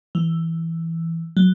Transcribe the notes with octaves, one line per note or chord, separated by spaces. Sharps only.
E3
F#3